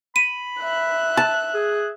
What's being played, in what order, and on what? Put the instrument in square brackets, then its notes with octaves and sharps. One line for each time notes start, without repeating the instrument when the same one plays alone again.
[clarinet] B5 [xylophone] D#7
[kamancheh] E5 F#6
[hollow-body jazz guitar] A5
[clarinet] G#4